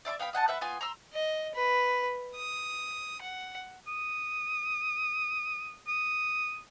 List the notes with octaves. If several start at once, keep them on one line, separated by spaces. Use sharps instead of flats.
D5 E5 C6 D6
B3 F5 G5 B5
D#5 F#5 G#5 A5
B4 E5 F#5
B3 F4 G#5
A#5 C6 E6
D#5
B4
D#6
F#5
D#6
D#6